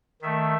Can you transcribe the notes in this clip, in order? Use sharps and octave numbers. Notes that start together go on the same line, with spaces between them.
D#3 A3 E5